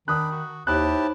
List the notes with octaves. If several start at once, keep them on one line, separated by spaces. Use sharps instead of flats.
D#3 D4 B5 D#6 F#6
F#4
D#2 D#4 E4 G4 C5 C#5 A5 F#6